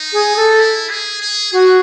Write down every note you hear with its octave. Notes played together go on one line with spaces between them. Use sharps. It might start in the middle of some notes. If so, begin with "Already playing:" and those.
Already playing: D#4
G#4
A4
E4
G#4
G#4
F#4 G#4